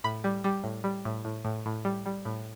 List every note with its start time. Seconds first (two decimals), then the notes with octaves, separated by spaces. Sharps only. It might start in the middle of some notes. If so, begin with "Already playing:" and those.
0.04 A2 B5
0.24 G3
0.44 G3
0.64 A2
0.84 G3
1.05 A2
1.25 A2
1.45 A2
1.66 A2
1.85 G3
2.06 G3
2.25 A2